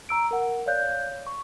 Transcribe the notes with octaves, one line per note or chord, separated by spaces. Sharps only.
A#5 E6 D7
A#4 F#5
C#5 D5 F5 F#6 G6
C#6